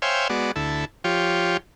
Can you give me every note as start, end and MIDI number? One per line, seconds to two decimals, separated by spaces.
0.02 0.28 72
0.02 0.28 73
0.02 0.28 76
0.02 0.28 77
0.02 0.28 79
0.02 0.28 80
0.29 0.52 56
0.29 0.52 59
0.29 0.52 66
0.29 0.52 74
0.56 0.85 38
0.56 0.85 64
0.56 0.85 69
1.04 1.57 53
1.04 1.57 65
1.04 1.57 67
1.04 1.57 73